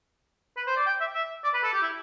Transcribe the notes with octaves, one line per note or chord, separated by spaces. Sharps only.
B4
C5
D5
G5
E5
E5
D5
B4
A4
G4
E4